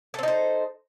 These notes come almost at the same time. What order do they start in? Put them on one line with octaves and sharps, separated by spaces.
A4 C4 D#4 C5